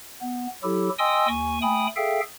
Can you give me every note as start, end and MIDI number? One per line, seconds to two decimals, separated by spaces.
0.21 0.47 59
0.63 0.89 54
0.63 0.89 64
0.63 0.89 67
0.63 0.89 69
0.99 1.28 75
0.99 1.28 79
0.99 1.28 80
0.99 1.28 84
0.99 1.28 87
0.99 1.28 88
1.28 1.59 39
1.28 1.59 80
1.28 1.59 85
1.62 1.87 57
1.62 1.87 79
1.62 1.87 80
1.62 1.87 83
1.62 1.87 87
1.96 2.20 68
1.96 2.20 69
1.96 2.20 76
1.96 2.20 77
1.96 2.20 79